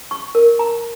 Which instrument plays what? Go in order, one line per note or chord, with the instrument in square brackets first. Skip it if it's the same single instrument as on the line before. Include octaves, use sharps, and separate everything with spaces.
[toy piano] C#6
A#4
A#5